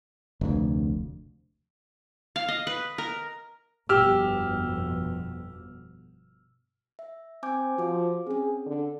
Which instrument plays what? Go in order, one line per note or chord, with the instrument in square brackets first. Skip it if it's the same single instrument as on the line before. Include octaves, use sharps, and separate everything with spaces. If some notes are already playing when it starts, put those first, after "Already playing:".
[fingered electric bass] F1 D2
[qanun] F5
D#5
B4
A#4
[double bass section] G1 F2 B2 [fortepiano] G4 [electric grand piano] E6 F6
[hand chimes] E5
[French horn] C4 [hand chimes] G#5 D6 G6
[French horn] F3 [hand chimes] F#4 D6
[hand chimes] C4 C#4 [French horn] G#4
[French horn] D3